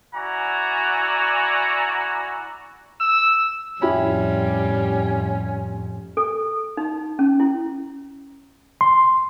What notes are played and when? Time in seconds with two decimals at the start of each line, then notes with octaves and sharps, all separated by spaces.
0.15 E4 F#4 D5 F#5 G#5 A#5
3.01 E6
3.82 F2 A2 G3 C#4 E4 G4 B5
6.17 A4
6.77 D#4
7.19 C#4
7.40 E4
8.81 C6